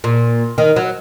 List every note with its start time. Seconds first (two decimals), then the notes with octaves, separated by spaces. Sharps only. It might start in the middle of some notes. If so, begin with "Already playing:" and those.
0.04 A#2
0.58 D#3
0.76 F#3